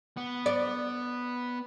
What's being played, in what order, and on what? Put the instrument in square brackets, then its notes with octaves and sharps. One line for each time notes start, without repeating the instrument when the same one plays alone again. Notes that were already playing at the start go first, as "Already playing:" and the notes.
[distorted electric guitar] B3
[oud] D5